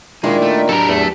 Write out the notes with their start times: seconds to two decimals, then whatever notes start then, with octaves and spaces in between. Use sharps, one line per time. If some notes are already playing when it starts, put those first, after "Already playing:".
0.24 A#2 D#3 G#3 A#3 D4 E4
0.42 A3
0.69 F#3 D4 G4 A4 A#4
0.88 E2 A3